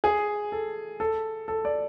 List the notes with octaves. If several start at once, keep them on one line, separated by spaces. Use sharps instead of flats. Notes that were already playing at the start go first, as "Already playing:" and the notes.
G#4
A4
A4
A4
D5